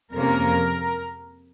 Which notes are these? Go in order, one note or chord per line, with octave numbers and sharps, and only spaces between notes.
F2 C3 F3 A#3 C#4 A#4